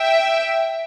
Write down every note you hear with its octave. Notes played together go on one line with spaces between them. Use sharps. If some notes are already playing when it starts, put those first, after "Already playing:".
Already playing: E5 G5